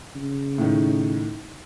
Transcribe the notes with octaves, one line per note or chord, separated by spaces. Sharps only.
C#3
A2 D#3